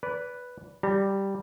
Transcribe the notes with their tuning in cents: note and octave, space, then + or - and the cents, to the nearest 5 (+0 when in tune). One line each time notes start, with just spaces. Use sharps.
B4 +0 D5 -30
G3 +0 A#5 -35